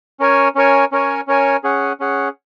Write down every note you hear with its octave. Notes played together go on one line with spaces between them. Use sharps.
C#4 A#4 C#5 G#5
C#4 A#4 C#5 G#5
C#4 A#4 C#5 G#5
C#4 A#4 C#5 G#5
C#4 G#4 F#5
C#4 G#4 F#5